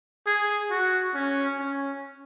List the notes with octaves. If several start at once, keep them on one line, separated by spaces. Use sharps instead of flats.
G#4
F#4
C#4
C#4